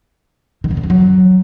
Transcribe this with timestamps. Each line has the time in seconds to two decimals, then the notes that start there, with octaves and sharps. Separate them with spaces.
0.64 D#3
0.71 C#3
0.77 D3
0.83 F3
0.90 F#3